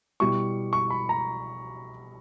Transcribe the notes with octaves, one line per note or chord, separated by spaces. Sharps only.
B2 G3 B3 E4 C#6
C#6
B5
A#5